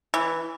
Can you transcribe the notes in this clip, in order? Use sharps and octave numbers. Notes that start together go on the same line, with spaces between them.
E3